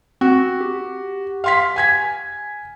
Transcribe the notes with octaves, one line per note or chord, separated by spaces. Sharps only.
C4 F#4
G4
F5 C6 B6
G#5 G#6 B6